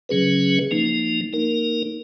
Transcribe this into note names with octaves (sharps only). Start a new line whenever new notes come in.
C#3 F#3 C#4 G#4 B4
F3 A#3 D#4
A#3 D#4 A#4